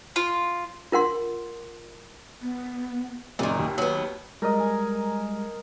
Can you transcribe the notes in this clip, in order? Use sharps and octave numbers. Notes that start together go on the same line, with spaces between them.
F4
F4 A#4 F#5 C6
B3
F#1 F#2 A#2 D#3
D#2
F#3 B3
G3 G#3 A#4 D#5
G#5